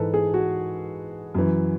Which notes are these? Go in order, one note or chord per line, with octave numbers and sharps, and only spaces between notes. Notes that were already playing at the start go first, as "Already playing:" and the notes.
Already playing: G#2 E3 A4 B4
G#4
F#4
F#2 E3